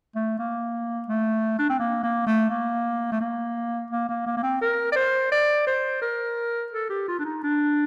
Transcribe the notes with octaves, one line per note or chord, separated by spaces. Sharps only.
A3
A#3
A3
D4
C4
A#3
A#3
A3
A#3
A3
A#3
A#3
A#3
A#3
A#3
C4
A#4
D5
C5
D5
C5
A#4
A4
G4
F4
D4
D#4
D4